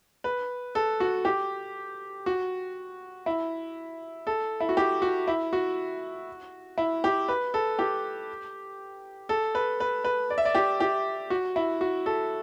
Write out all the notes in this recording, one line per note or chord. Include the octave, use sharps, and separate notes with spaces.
B4
A4
F#4
G4
F#4
E4
A4
E4
F#4
G4
F#4
E4
F#4
E4
G4
B4
A4
G4
A4
B4
B4
B4
D5
E5
D5
G4
G4
F#4
E4
F#4
A4